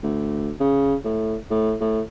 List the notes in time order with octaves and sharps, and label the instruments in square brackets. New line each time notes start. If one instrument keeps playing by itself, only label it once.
[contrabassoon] D2
C#3
A2
A2
A2